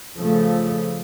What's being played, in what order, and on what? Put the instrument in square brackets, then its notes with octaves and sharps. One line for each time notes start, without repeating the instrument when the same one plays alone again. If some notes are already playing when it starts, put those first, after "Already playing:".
[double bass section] C#3 F3 A3